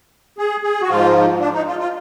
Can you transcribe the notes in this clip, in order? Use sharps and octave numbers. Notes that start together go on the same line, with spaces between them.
G#4
G#4
F#4
G#2 F3 F4
D4
D#4
F4
F4